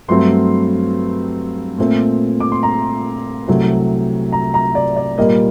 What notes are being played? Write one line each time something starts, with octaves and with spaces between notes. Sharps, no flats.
G2 F#3 A3 C4 C6
A#2 A3 C4
D6
C6
A#5
C2 C3 F#3 A3 C4
A#5
A#5
D5
D5
A#2 G3 A#3 D#5